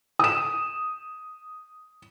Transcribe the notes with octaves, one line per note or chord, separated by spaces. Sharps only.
D#6 E7